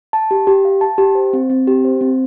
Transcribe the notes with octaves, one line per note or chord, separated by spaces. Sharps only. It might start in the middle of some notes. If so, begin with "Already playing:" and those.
A5
G4
G4
F5
A5
G4
C5
C4
C4
G4
C5
C4